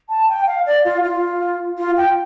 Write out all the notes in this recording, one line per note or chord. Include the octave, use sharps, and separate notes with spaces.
A5
G5
F5
D5
F4
F4
F4
G5